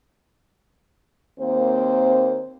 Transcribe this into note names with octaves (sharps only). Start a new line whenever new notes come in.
D#2 A#3 C4 C5